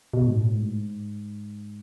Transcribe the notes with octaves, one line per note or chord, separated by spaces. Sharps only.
B2
G#2
A2
G#2